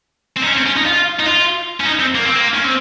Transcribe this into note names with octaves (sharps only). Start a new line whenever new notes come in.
C4
D#4
C#4
C4
C#4
D#4
F4
D#4
F4
C#4
D#4
C4
A#3
C4
A#3
C#4
C4